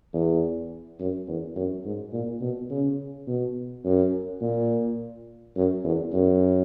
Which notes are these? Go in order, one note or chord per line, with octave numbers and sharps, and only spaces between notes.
E2
F#2
E2
F#2
G#2
A#2
B2
C#3
B2
F#2
A#2
F#2
E2
F#2